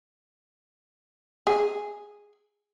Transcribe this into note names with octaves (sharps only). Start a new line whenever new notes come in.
G#4